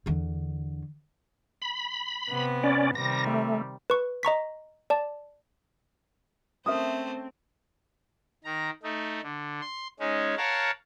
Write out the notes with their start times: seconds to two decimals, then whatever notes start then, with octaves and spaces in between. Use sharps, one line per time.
0.06 E2 D3
1.62 B5
2.30 C3 B3
2.63 C#4 D5
2.95 C3 D#3 G3 A#6
3.27 A3
3.90 B4 C#6
4.23 D#5 A#5 C#6 B6
4.90 D5 A5
6.66 A3 C4 C#4 A#4 C5 E5 D#6
8.44 D#3 A#5
8.83 A3 D#4
9.23 D3
9.61 C6
10.00 G#3 C#4 D#4
10.37 A#4 C#5 F5 F#5 A5